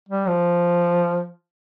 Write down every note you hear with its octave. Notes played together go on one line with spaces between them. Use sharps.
G3
F3